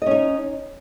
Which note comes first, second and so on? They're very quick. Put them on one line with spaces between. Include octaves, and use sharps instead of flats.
D#5 C#4 D#4